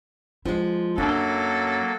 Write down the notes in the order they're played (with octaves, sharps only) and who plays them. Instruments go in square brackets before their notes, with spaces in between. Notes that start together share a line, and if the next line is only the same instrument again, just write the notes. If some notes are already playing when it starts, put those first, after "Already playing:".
[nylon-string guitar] F3 G#3 [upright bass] E4
[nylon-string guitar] F#2 [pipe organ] F#3 A#3 [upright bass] D4 [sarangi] A4